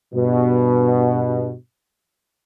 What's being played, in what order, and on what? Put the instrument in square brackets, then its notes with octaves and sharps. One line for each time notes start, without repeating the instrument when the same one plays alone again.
[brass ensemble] G2 B2